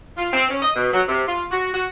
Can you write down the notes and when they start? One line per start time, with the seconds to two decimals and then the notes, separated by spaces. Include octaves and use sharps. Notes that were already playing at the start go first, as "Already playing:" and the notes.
0.17 F4
0.33 C4
0.50 C#4
0.62 D#5
0.76 B2
0.93 F#3
1.09 C3
1.27 F4
1.51 F#4
1.74 F#4